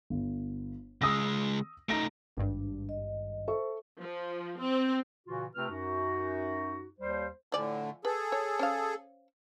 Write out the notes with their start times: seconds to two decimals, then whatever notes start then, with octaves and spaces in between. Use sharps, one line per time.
0.10 G1
1.02 C#3 G#3 D#6 E6 A#6
1.89 A3 D#4 A#5 A#6 D7
2.37 G#1 G2 D4
2.89 D#5
3.48 A4 C5 E5 C#6
4.00 F3
4.61 C4
5.27 A#2 C#3 E3 F4 F#4
5.55 C3 A3 C4 F4 B4 F6
5.70 F#2 D#4 F#4
7.00 D#2 G3 C5
7.52 A2 D3 F3 D5 G#5
8.05 G#4 A4 B4
8.32 C#5
8.59 C#4 C5 F5